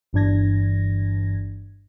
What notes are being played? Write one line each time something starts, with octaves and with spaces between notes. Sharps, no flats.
G1 G2 E3 D4 G#6 A#6